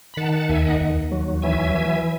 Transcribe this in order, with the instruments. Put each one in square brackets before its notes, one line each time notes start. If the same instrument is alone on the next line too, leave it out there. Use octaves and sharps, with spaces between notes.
[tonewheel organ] B5
D#3 F#5 A5
F#5 A5
D#2 E5 G#5
D#5 F#5
D#2
F#3
E3 E5 G#5
E3